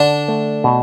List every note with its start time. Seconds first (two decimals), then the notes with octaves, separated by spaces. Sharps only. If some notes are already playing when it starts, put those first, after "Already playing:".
Already playing: D3 D4
0.28 A3
0.64 B2